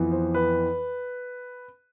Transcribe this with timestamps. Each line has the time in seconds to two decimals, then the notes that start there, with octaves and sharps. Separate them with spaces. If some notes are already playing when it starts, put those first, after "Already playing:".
Already playing: F2 E3 B3
0.12 C5
0.35 B4